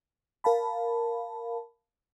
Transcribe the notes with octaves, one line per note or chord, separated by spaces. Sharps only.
A#4 F5 A5 B5